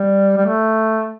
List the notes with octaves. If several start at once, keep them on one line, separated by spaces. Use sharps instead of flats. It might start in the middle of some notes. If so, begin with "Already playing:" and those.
Already playing: G3
G3
A3